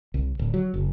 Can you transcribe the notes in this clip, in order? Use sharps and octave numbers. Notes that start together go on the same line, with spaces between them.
C2
D1
F#3
F#1